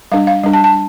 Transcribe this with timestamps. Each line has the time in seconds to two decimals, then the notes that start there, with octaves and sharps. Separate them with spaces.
0.12 G3 D4 F5
0.27 F5
0.43 G3 D4
0.53 A5
0.64 A5